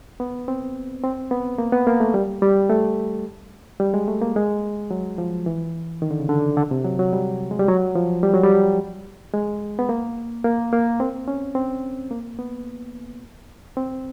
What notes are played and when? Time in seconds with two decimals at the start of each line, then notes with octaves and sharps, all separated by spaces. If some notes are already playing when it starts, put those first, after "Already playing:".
0.20 B3
0.48 C4
1.04 C4
1.31 B3
1.58 A#3
1.72 B3
1.87 A#3
2.00 A3
2.14 G3
2.42 G3
2.69 A3
3.80 G3
3.94 G#3
4.08 A3
4.22 A#3
4.36 G#3
4.91 F#3
5.18 F3
5.46 E3
6.02 D#3
6.11 D3
6.20 C#3
6.29 D3
6.57 D3
6.71 C3
6.84 F#3
6.99 F#3
7.13 G3
7.51 G#3
7.59 G3
7.68 F#3
7.95 F3
8.23 G3
8.33 F#3
8.43 G3
9.34 G#3
9.79 B3
9.89 A#3
10.44 A#3
10.73 A#3
11.00 C4
11.28 C#4
11.55 C4
12.11 A#3
12.39 B3
13.77 C4